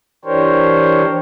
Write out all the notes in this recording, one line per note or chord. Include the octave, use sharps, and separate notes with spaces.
E3 D4 G4 A#4 C5 C#5